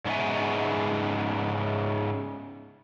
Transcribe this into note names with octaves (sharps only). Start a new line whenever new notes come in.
G#2 C#3 B3 D#4 E5 G#5